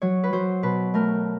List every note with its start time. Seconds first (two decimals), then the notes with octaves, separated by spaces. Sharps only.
0.02 F#3 C#5
0.24 B4
0.33 F#3 C5
0.63 B2 B4
0.94 A3 A#4